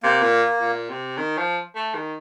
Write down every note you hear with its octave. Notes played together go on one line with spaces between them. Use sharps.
C3 A#3
A#2
A#2
C3
D#3
F3
A3
D#3